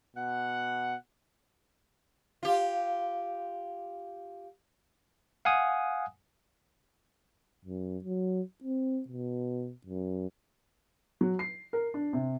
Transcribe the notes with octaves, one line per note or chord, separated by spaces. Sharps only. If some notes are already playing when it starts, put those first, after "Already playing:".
B2 F#5
F4 G4
F5 F#5 G#5 D#6
F#2
F#3
C4
B2
F#2
F#3
C7
A#4
D4
C3